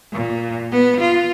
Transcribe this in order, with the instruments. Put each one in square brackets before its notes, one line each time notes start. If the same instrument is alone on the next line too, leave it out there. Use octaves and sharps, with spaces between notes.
[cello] A#2
B3
F4